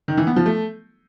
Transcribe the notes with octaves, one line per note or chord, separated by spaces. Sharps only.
D#3
E3
B3
F3
A3